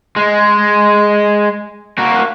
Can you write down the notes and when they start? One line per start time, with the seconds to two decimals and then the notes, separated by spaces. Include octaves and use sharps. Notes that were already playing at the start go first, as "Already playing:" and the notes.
0.16 G#3
1.98 A#3 F#4